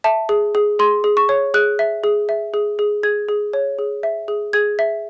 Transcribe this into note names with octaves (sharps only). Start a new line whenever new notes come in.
E5 A5
G#4
G#4
G#4 C6
G#4
C#6
C#5
G#4 F#6
E5
G#4
E5
G#4
G#4
G#4 G#6
G#4
C#5
G#4
E5
G#4
G#4 G#6
E5